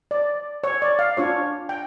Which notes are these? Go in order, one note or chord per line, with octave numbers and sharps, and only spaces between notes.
D5
C#5
D5
F5
D4 F4 C#5
G5